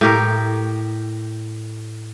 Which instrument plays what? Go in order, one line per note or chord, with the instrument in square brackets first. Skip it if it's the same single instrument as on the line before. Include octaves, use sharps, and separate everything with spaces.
[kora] A2 G4 A#4